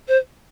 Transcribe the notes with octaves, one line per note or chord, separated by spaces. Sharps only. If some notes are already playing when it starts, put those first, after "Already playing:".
C5